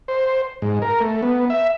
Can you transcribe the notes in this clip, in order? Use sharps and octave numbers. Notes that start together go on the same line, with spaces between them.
C5
G#2
A#4
A3
B3
E5